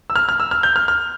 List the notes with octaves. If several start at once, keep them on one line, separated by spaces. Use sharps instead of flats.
E6
F6
F6
E6
F6
G6
F6
F6